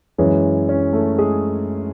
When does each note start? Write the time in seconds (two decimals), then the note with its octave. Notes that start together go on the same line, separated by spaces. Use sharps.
0.18 F#2 E3 G#3 C#4 C#5
0.68 C#4 C#5
0.93 A3 A4
1.18 G#3 G#4